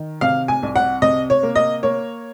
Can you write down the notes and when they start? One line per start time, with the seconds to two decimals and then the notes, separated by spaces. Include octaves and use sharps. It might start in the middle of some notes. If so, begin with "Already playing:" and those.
Already playing: D#3
0.21 C3 F5
0.48 G#5
0.63 C2
0.76 F#5
1.02 C3 D#5
1.30 C#5
1.43 A#3
1.56 D#5
1.83 A#3 C#5